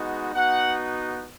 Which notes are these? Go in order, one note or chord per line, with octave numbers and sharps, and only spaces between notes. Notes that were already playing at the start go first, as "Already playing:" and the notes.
Already playing: G#3 B3 D#4 F#4
B3 D#4 F#4 F#5